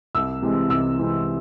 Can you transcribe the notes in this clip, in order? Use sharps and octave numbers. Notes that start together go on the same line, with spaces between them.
C2 E6
C3 E3 G#3 C4
C2 E6
C3 E3 G#3 C4